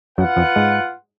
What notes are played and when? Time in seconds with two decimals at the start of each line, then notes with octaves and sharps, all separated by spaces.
0.18 F#2 F#3 F4 B4 F#5
0.36 F2 F3
0.56 G#2 G#3